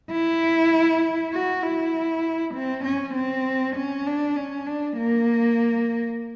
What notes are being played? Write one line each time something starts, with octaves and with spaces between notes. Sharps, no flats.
E4
F#4
E4
C4
C#4
C4
C#4
D4
C#4
D4
A#3